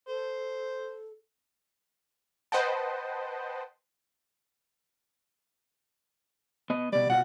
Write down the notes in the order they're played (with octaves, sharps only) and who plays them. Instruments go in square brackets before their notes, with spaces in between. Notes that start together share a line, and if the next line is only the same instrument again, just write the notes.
[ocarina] A4 [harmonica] C5
[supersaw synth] B4 C5 D#5 F#5 G5 A5
[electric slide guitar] B3 D#5
[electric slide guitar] B2 G3 [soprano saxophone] D5
[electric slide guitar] B2 F4 F#4 [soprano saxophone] F#5